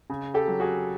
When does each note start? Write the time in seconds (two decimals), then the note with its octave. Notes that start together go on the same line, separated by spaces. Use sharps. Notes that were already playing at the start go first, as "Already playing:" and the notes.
0.10 C#3
0.34 G4 A4
0.48 F#3
0.60 F#4 G#4